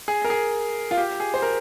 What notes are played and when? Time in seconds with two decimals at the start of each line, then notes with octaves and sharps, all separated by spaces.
0.08 G#4
0.24 A#4
0.30 G#4
0.91 F4
0.97 G4
1.20 G#4
1.34 C5
1.42 A#4